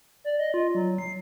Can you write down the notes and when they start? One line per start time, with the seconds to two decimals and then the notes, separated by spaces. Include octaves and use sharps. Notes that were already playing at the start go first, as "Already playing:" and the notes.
0.24 D5
0.39 D#5
0.54 F4
0.75 F#3
0.98 C7